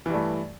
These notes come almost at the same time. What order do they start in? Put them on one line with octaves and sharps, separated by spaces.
E3 G2 A3